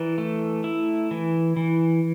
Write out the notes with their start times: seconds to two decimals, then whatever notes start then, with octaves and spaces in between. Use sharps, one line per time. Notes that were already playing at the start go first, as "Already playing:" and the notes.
Already playing: E3 A#4 D5
0.18 A3
0.64 E4
1.11 E3
1.57 E3